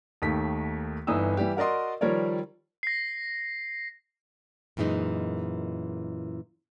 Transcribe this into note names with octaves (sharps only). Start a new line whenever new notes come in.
D#2 D#3 A3 B6
G1 E3 D4 D#4 D#6 E6
E3 G3 G4
F#4 A#4 D5 D#5 C6
D#3 F3 G3 A#4 C#5 D5
A#6 C7
F#2 A#2 E3 G#3 D#4